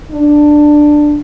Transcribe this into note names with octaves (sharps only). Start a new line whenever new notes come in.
D4